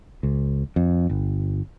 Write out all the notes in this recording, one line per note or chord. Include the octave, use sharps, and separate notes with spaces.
C#2
F2
G1